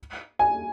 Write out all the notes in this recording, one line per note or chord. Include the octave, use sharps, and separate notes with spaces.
G#5